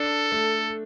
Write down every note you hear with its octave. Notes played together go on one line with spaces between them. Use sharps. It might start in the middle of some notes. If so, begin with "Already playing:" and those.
Already playing: D4 A4
A3